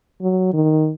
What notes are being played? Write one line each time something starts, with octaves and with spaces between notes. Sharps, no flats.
F#3
D#3